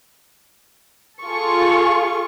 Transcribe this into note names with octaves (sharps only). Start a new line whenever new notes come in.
F4 G#4 A4 C#6